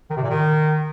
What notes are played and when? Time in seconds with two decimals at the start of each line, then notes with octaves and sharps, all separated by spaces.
0.10 D#3
0.17 C3
0.23 A#2
0.30 D#3